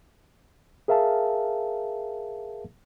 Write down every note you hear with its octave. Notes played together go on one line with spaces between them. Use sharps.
G#4 A#4 E5 F5 A5